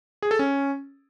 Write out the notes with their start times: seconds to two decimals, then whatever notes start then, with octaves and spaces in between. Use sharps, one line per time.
0.22 G#4
0.31 A4
0.39 C#4